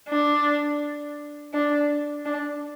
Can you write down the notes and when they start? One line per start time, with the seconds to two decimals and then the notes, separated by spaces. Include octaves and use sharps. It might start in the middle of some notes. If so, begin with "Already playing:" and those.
0.09 D4
1.53 D4
2.26 D4